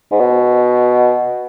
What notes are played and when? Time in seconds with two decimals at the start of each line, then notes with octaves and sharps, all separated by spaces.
0.12 G#2
0.20 B2